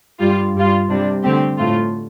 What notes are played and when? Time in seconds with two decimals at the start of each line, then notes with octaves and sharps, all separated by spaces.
0.19 G2 G3 F4
0.54 G2 G3 F4
0.89 C3 G3 D4
1.23 D3 A3 C4 G4
1.57 A2 A3 F4